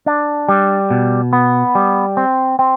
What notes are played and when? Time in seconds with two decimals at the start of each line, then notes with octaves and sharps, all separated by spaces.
0.06 D4
0.48 G3
0.91 B2
1.33 B3
1.75 G3
2.17 C4
2.59 C4